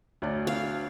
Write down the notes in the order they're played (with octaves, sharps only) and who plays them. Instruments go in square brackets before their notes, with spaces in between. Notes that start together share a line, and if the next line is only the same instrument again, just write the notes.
[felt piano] D2 D5 [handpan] D4 F#4 C#5
[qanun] F5